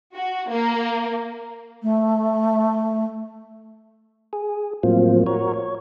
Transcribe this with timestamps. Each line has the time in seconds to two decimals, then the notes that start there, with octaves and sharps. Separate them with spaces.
0.15 F#4
0.50 A#3
1.82 A3
4.33 G#4
4.83 A2 F3 F#3 A#3 C4 F4
5.26 F#4 A#4 C#5
5.54 C#5